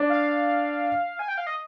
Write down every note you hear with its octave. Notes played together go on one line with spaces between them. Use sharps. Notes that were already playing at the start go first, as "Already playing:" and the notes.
Already playing: D4
F5
G#5
G5
F5
D#5